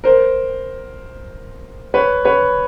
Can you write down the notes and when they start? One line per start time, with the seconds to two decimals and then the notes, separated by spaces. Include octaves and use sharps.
0.04 A#4 C5
1.94 B4 C#5
2.25 B4 C#5